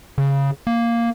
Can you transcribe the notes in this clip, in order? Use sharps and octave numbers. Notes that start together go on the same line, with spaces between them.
C#3
A#3